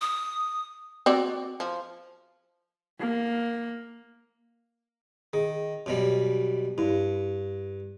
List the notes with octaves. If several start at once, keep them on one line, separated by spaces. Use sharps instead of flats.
D#6
C4 F#4 D5
F3
A#3
D#3 G#4
F#2 B2 G3
G2 E4